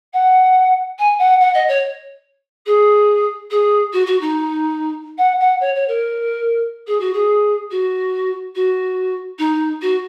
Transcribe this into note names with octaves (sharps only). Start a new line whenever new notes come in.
F#5
G#5
F#5
F#5
D#5
C#5
G#4
G#4
F#4
F#4
D#4
F#5
F#5
C#5
C#5
A#4
G#4
F#4
G#4
F#4
F#4
D#4
F#4